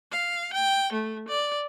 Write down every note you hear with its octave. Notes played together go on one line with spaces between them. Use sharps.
F5
G5
A3
D5